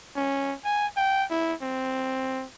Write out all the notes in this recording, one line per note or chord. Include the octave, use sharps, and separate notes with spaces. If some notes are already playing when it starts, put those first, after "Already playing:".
C#4
G#5
G5
E4
C4